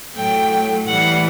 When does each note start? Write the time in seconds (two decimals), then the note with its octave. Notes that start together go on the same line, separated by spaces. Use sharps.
0.16 A2 F#3 A3 G5
0.87 A2 E3 G3 F#5